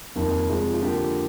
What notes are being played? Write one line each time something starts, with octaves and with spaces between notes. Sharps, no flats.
F2 D#3 G3 A#3
C3 F3 G#3
F4
D3 F3 A#3 G4